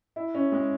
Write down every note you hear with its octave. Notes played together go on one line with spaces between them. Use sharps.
E4
C#4
G#3